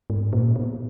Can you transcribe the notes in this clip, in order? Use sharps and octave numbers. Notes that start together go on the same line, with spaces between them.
G#2
A#2
B2